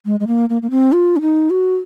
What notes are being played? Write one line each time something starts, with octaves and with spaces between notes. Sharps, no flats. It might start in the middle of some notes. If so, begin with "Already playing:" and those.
G#3
G#3
A#3
A#3
A#3
C4
F4
C#4
D#4
F#4